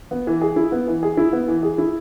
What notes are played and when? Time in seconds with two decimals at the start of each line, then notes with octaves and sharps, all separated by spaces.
0.11 B3
0.27 E3
0.41 G#4
0.56 E4
0.72 B3
0.87 E3
1.03 G#4
1.17 E4
1.33 B3
1.48 E3
1.63 G#4
1.78 E4